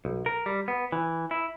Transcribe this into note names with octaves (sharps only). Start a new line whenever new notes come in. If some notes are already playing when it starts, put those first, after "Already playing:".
B1
A#4
G3
B3
E3
E4